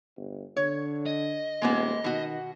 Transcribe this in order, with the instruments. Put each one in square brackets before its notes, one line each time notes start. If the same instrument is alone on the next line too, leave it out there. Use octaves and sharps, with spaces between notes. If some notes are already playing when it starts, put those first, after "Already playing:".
[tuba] G1
[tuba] D3 [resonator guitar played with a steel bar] C#5
[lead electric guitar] D#5
[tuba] D#1 [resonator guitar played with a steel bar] G#3 A#3 B3
[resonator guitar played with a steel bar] B2 F#4 [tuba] D#3